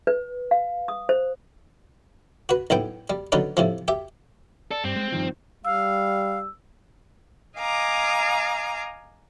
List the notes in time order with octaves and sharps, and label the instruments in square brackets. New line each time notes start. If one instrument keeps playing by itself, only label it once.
[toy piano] B4
F5
D#6
C5
[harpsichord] F#4 B4
B1 A2 B3 G5
G3
D3 F#3 B3 C#4 D#4 B4
A2 C3 F3
G4 E5
[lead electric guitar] A4 [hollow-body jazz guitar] D5
[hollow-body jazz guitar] G2 [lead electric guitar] C4
[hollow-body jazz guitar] G#3
G2 D#3 F3
[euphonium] G3 [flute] F5 [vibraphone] E6
[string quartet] D#5 F5 G#5 A#5 D6